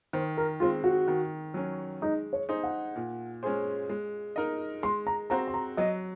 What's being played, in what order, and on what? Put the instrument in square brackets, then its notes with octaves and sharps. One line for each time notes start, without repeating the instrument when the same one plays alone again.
[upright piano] D#3 [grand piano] C5
[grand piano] A#4
[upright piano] G#3 C4 [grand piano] F4
[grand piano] F#4
[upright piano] D#3
F#3 C#4
[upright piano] G#3 [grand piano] D#4
[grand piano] C#5
[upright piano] D#4 G#4 C5
[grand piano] F#5
[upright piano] A#2
G#3 C#4 G#4 C5
G#3
D#4 A#4 D#5
[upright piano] G#3 [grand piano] C6
[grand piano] A#5
[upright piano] C4 F#4 C5 [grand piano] A#5
[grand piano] C6
A#5
[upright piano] F#3 [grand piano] D#5